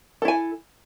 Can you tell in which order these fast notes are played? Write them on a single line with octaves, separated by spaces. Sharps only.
A4 E4 G#5